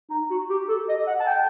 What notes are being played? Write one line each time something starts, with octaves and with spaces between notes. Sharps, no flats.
D#4
F#4
G4
A4
D#5
F#5
A5
G5